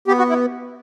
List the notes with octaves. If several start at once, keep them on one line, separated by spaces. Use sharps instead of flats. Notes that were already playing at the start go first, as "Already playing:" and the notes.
B3 G4
F#4
E4